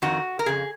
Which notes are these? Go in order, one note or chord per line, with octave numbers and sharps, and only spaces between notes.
F2 D#3 F#4
A#4
F2 C#3 G#4